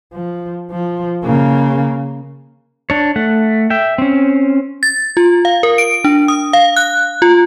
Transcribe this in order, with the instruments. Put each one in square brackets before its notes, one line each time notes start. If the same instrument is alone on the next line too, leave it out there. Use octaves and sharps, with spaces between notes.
[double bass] F3
F3
C#3 A#3
[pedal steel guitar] D4 C#5
A3 F#5
E5 G5
C4 C#4
[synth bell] A6
F4
F5
A#4
D7
D4
D#6
F5
F#6
F4